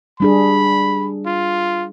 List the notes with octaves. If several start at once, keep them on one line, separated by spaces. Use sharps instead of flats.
G3 D4 G#4 B5
F4